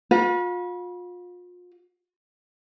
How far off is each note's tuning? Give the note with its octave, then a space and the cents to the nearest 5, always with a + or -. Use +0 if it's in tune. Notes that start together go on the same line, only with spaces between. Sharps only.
F4 +35 B4 -35